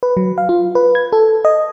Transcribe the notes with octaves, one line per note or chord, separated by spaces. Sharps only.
B4
F#3
F5
F4
B4
G#6
A4
D#5